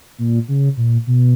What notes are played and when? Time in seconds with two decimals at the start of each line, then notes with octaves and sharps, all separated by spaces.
0.18 A#2
0.48 C#3
0.77 A#2
1.07 B2